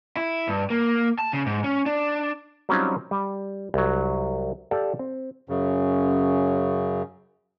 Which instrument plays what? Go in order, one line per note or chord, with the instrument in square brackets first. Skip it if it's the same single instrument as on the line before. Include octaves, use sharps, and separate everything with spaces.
[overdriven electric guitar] E4
G2
A#3
A5
C#3
G#2
C#4
D4
[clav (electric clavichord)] F#3 G3 C4 C#4 D#4 F4
G3
C2 F#3
G4 A4 D5 F5 A5
C4
[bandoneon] F#2 C#3